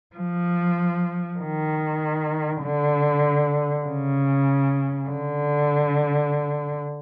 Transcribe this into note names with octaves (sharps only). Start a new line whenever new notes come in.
F3
D#3
D3
C#3
D3